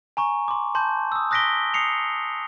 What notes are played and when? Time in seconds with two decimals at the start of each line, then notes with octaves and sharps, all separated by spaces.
0.17 G#5 A#5 C#6
0.48 C6 D6
0.75 A5 C6 G6
1.12 D#6 E6
1.31 D#6 F#6 A#6 B6 D7 G7
1.74 D#6 C7 C#7 F7